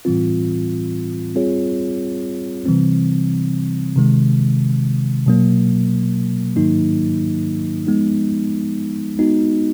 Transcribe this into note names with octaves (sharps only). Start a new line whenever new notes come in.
A2 E3 G3 C4 F4
G3 C4 F4 G#4 C#5
C3 E3 G3 C4
C3 D#3 G#3
B2 F#3 A#3
G#2 D#3 F#3 A#3 D#4
F3 G#3 B3 D#4
G#3 B3 D#4 F#4